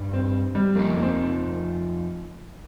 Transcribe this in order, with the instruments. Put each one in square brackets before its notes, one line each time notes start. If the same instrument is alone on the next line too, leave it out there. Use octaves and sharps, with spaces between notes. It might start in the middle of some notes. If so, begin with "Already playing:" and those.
Already playing: [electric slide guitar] G2 G3 D#4
[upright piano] C4
G3
[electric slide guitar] F2 F3 D#4 [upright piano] A#3
[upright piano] A#3
C4